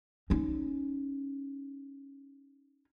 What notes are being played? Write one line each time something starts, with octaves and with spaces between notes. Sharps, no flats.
C#4 D#4